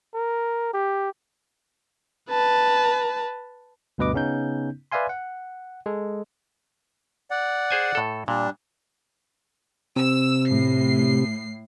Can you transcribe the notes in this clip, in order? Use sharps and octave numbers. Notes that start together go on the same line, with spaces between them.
A#4
G4
B4 A5
D2 G2 B2 B4 D#5 D6
C#3 B3 C#4 D#4 G6
B4 D5 E5 F5 G#5 C6
F#5
G#3 A4
D5 F#5
G#4 C5 G#5
A2 A4
A#2 G3 D4
C3 E6
A2 C7